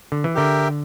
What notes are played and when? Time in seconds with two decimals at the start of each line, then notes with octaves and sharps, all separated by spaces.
0.12 D3
0.24 E3
0.35 D3 G4 A#4 E5 G5